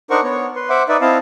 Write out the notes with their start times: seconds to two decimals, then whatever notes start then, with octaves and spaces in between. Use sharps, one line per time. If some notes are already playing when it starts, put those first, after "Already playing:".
0.11 D4 D#4 A#4 C5 F#5 C#6
0.23 B3 C#5
0.56 B4 C6
0.69 C5 E5 F#5 D6
0.89 D#4 B4 D5 E5
1.01 C4 E4 D#5 F5 A5